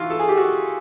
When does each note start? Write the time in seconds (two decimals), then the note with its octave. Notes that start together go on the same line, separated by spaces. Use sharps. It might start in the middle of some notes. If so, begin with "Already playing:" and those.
Already playing: E3 D#4 F4 F#4
0.10 A4
0.20 G#4
0.29 G4
0.37 F#4